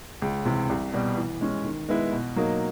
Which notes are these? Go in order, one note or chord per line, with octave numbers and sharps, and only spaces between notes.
C#2
C3 E3
C2
B2 G3
E3
G#3 C#4
D#3
G#3 B3 E4
B2
F#3 A#3 D#4